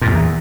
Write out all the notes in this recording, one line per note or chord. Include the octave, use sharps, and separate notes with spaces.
A#2
F2
E2